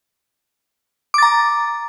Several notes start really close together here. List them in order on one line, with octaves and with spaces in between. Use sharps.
D6 A6 A#5